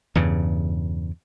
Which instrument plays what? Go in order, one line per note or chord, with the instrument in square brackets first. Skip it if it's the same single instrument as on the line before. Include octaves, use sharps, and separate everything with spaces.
[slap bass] E2 G2 C#3